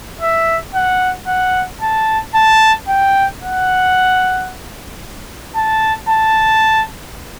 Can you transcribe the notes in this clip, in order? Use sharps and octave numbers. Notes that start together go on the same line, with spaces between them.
E5
F#5
F#5
A5
A5
G5
F#5
A5
A5